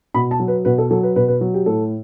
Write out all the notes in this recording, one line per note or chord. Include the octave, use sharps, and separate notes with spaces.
B2 B5
A5
F#3
B4
B2 B4
A4
F#3 A4
B4
B2 B4
B4
F#3
G4
A2 A4